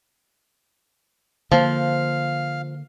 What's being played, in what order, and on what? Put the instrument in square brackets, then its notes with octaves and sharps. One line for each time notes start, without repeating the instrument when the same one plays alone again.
[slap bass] D3 A#3 [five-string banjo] F3 [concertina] F5